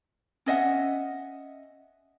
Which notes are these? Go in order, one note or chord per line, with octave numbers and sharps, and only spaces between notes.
C#4 D#5 E5 F#5